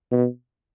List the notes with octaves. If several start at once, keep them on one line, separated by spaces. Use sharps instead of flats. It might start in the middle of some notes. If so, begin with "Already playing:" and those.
B2